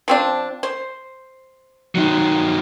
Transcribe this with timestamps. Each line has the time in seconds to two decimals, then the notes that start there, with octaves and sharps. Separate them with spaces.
0.08 F3 C4 D4
0.63 C5
1.95 D#3 F#3